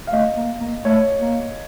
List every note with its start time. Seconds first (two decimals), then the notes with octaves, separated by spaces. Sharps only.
0.07 F5
0.13 A3 D#5
0.37 A#3
0.60 A#3
0.85 A3 C#5
1.21 A#3